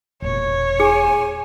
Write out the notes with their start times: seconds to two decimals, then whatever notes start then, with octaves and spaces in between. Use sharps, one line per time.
0.22 E1 A#2 C#5
0.80 G#4 G#5